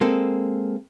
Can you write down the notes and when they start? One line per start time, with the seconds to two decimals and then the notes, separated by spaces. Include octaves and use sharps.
0.01 G#3 A#3 C4 A4